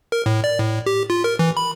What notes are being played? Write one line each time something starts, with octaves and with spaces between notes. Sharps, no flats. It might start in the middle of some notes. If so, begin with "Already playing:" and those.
A#4
A2
D5
A2
G4
F4
A#4
E3
B5